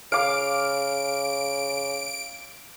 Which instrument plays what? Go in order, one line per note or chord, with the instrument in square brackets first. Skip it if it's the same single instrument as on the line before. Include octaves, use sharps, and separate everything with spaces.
[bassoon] C#3 [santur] F5 D6 [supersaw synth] D7